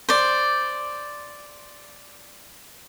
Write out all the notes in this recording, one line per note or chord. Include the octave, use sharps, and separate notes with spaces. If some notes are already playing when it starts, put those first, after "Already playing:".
C5 D5